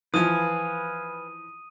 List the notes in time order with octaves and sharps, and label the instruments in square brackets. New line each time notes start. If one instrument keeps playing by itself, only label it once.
[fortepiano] E3 F3 [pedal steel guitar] B4 F5 G#5 [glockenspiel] D#6 D#7